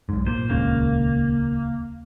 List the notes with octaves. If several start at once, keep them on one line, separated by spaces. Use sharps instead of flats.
B1 G#2
A#2 C5
D#1 C#2 C#3 A#3